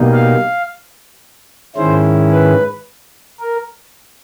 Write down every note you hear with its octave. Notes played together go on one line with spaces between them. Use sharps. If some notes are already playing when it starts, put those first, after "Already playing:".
Already playing: B2 G3 A#3 D#4
F5
G#2 D#3 G#3 C#4 E4 C5
B4
A#4